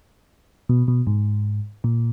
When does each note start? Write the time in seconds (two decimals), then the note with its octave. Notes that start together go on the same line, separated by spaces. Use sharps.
0.69 B2
0.88 B2
1.07 G#2
1.84 A#2